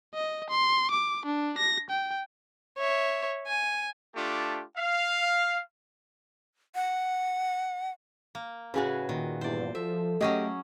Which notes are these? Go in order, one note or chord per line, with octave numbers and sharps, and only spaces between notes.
D#5
C6
D6
D4
A#6
G5
C#5 E5
G#5
A3 D4 F4 G4
F5
F#5
A#3
A2 C#3 F#4 G#4 B4
A#2 D#3
E2 G2 C5 D5
F3 A4 E5
F#3 A3 C#4 G4 G#4 D#5